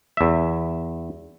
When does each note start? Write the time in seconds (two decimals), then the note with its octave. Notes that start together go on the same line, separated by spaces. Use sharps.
0.17 E2 E5